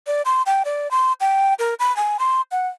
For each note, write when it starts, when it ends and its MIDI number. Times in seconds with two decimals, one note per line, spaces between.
0.07 0.22 74
0.25 0.42 84
0.46 0.63 79
0.65 0.90 74
0.91 1.12 84
1.20 1.54 79
1.59 1.74 70
1.80 1.95 83
1.97 2.17 80
2.19 2.41 84
2.52 2.68 78